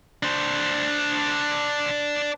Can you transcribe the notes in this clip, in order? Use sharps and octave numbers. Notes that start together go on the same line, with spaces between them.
D4 C5